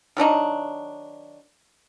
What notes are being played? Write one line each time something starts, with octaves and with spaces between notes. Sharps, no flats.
D#3 F#3 D4 D#4